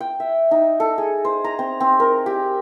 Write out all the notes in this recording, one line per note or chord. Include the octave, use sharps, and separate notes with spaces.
G5
E5
D#4
A4
G#4
C5
A#5
C4
C4
A#4
G4